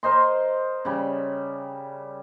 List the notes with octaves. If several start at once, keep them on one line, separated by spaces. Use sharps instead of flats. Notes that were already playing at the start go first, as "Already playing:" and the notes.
A#4 C5 D#5 C6
C#3 G3